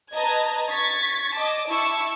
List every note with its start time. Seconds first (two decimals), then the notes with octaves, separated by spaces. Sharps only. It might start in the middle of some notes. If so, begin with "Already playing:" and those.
0.12 B4 D#5 A5 A#5 G#6
0.69 C#6 G#6 A6 B6
1.36 D#5 A5 D6
1.69 E4 A5 C#6 E6